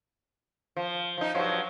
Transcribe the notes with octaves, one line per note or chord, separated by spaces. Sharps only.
F3
F3 D#4
G2 F3 F#3